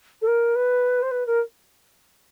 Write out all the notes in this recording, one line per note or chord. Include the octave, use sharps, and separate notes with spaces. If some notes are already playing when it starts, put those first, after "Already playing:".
A4
A#4
B4
C5
B4
A#4